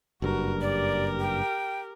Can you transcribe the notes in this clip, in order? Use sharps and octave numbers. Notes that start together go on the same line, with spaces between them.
F#1 G2 F#4 A#4
G4 A#4 D5
G5